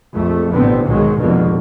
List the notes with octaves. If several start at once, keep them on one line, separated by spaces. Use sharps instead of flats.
A#1 F2 A3
A1 B2 D3 B3 C4
B1 G#2 D#3 F#3 G#3
F1 F2 G#2 B2 D3 A#3